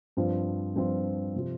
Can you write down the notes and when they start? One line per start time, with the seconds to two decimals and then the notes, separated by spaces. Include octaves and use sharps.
0.17 G2 F3 C4 F4
0.76 G2 F3 C4 F4
1.36 C3 F3